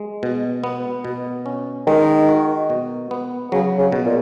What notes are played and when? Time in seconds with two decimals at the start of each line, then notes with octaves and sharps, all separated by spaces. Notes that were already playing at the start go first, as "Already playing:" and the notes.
Already playing: G#3
0.23 B2
0.64 B3
1.05 B2
1.46 C#4
1.87 D#3 G#3
2.29 F#4
2.70 B2
3.11 B3
3.52 C#3 F#3
3.78 C#3
3.92 B2
4.06 A#2